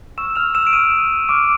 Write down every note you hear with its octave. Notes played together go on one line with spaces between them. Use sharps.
C#6 E6 F6 E7
F6 F7
E6 E7
D7
C#6 D#6 F6 D#7
C#6 D6 F6 D7